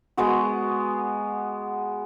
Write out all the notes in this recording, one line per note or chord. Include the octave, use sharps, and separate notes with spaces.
G#3 B3 F#4